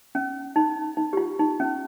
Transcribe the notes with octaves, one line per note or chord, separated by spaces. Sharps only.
C#4
D#4
D#4
G4
F4
D#4
C#4